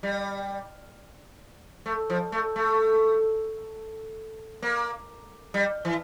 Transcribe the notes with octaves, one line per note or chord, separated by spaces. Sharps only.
G3
A3
F3
A3
A3
A#3
G3
E3